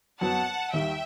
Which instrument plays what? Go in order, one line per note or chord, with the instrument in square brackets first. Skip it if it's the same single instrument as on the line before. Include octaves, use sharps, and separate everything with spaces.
[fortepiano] F#2 F#3 B3 [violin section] F#5 A5
[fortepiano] D#2 D#3 G3 [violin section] E5 G5